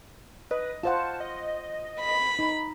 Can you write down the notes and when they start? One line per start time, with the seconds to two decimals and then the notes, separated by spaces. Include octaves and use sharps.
0.51 B4 D#5
0.83 F4 C5 F#5 A5
1.20 D#5
2.00 B5
2.39 D#4